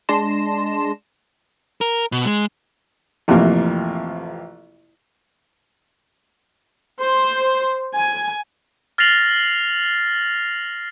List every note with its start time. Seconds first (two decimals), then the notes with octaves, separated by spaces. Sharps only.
0.09 G#3 D4 A5 C6 A#6 E7
1.81 A#4
2.12 B2
2.25 G#3
3.28 A1 F2 C3 A#3
7.02 C5
7.95 G#5
8.98 F6 A6 A#6 C7 F7 F#7